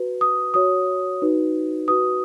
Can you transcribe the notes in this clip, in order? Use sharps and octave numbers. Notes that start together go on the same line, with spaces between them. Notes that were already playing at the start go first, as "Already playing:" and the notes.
Already playing: F#4 B4
D#6
F#4 C#5 D#6
D#4 F#4 B4
F#4 B4 D#6